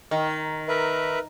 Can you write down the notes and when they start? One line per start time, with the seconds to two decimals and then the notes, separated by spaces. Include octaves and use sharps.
0.11 D#3
0.68 A#4 B4 E5